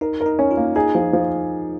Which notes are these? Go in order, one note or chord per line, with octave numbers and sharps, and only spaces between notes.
D#4 A#4
A#4
D#4
C#4
F4
A#3
D#4 G#4
F3
F3